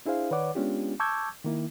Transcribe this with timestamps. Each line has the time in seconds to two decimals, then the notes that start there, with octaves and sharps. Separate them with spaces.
0.06 D4 E4 G#4 C5 F5
0.31 D#3 B4 C#5 D5 F#5 D6
0.55 G#3 B3 C#4 D4 F4 G4
1.00 A5 C#6 D6 E6 G6 G#6
1.44 D#3 A#3 E4